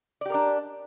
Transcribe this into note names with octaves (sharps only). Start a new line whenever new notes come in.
D4 G4 A#4 D5